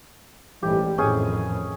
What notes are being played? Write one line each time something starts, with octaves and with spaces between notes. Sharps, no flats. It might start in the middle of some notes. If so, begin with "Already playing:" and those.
A1 G#2 G3 G4
F2 A2 D#3 C#4 G#4 G#5